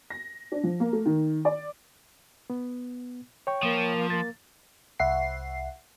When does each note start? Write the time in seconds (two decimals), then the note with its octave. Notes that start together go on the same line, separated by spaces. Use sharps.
0.10 A#6
0.52 D4
0.64 F3
0.80 A#3
0.93 A3
1.06 D#3
1.45 D5
2.50 B3
3.47 C#5 G5 C#6
3.63 F3 A#3
4.10 A#3 A6
4.99 C2 E5 F#5 C7